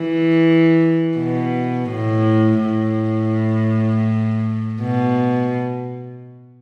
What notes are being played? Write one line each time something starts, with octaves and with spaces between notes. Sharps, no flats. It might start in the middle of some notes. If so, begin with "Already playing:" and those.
Already playing: E3
B2
A2
A2
B2